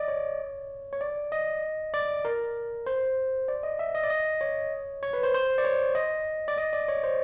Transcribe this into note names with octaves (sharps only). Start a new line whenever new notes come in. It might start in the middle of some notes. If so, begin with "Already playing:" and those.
Already playing: D5 D#5
C#5
C#5
D5
D#5
D5
A#4
C5
D5
D#5
E5
D#5
D5
D#5
C#5
C#5
B4
C5
C5
D5
C#5
D#5
D5
D#5
D5
C#5
C5